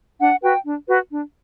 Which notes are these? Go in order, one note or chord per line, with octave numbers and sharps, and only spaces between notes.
D4 F#5
F#4 B4 G5
D4
F#4 B4
D4